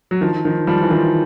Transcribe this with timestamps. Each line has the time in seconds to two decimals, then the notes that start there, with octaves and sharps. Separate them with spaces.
0.11 F#3
0.21 D#3 F3
0.45 D#3 F3
0.67 F3 G3
0.82 E3
0.90 D#3 F3